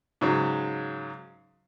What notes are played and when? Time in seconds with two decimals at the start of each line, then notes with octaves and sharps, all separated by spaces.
0.21 G#2 C#3 F#3